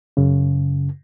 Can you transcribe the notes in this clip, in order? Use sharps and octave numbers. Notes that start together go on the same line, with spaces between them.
F#2 C#3